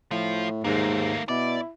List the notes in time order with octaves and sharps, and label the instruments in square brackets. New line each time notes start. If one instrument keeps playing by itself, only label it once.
[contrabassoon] A2 [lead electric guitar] F3 F4
[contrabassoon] D#2 [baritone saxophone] G#2 [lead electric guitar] A3 A#3
[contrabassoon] B2 [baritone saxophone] E4 [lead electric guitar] D5